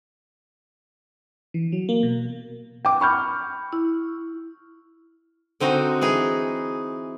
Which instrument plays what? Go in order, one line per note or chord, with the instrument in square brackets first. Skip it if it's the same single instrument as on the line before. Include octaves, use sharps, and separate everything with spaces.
[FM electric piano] E3
F#3
A#3
B2
[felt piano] G5 D6
[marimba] B5 [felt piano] C#6 F6 G6
[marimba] E4
[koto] D3 C4 D#4 F#4
E3 D#4 G#4